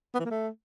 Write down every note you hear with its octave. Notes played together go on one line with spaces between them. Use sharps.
B3
E3
A#3
A3